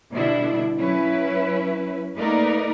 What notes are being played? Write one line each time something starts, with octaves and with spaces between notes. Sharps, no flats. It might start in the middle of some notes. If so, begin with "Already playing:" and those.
B2 D3 G3 D4 E4
F#3 C#4 E4 B4
A3 A#3 D#4 A#4 B4 D5